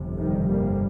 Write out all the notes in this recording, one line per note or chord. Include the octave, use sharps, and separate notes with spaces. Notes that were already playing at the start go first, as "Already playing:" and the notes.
Already playing: G1 F2 C3
D#3 G3
G3 A#3